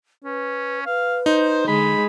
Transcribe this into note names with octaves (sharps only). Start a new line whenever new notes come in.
C#4 B4
B4 F5
D#4 C5
D3 G#3 B5